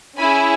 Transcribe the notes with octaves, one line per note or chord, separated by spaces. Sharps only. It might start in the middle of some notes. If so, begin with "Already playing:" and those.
C#4 E4 G#4 G#5 B5